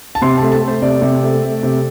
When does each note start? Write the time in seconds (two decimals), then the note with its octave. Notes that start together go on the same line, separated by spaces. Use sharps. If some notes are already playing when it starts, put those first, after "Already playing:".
0.15 A5
0.22 C3 C6
0.38 A3 A5
0.52 A5
0.62 A3
0.68 C5
0.82 C3 D5
1.02 C3
1.23 A3
1.43 A3
1.63 C3